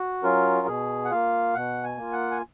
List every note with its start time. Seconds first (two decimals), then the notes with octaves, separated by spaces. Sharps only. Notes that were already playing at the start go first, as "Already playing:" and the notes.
Already playing: F#4
0.23 F#3 C#4 F4 A#4
0.67 B2 G#4
1.05 F#5
1.10 A#3 F4 F5
1.54 B2 F#5
1.84 G#5
1.98 A#3 F4
2.12 F#5
2.31 G#5